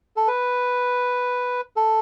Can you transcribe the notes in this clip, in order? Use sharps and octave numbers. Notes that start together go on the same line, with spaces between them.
A4
B4
A4